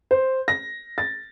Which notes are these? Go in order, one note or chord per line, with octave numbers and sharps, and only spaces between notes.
C5
A#6
A6